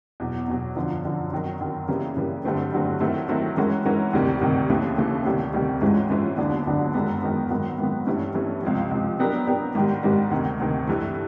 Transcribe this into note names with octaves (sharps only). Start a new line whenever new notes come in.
E2 B2 F#3
E2 B2 F#3
F#2 D3 F3
F#2 D3 F3
F#2 D#3 F#3
F#2 D#3 F#3
C#3 E3 G3 A#3
C#3 E3 G3 A#3
G2 D3 F#3 A3 C4
G2 D3 F#3 A3 C4
D#3 F#3 A3 C4 E4
D#3 F#3 A3 C4 E4
E3 G#3 C#4 F#4 A#4
E3 G#3 C#4 F#4 A#4
D2 C3 D#3 G3
D2 C3 D#3 G3
D#2 C#3 E3 A3
D#2 C#3 E3 A3
D2 C3 D#3 G3
D2 C3 D#3 G3
G#2 E3 G#3 C#4 F4
G#2 E3 G#3 C#4 F4
D#2 D3 F#3 B3 D4
D#2 D3 F#3 B3 D4
F#2 D#3 G#3 B3
F#2 D#3 G#3 B3
G#2 D#3 F#3 B3
G#2 D#3 F#3 B3
G2 E3 A3 C#4
G2 E3 A3 C#4
C#2 C3 F3
C#2 C3 F3
F#3 B3 D4 G4 A#4
F#3 B3 D4 G4 A#4
G#2 D#3 G3
G#2 D#3 G3
D2 C3 D#3
D2 C3 D#3
G2 E3 A3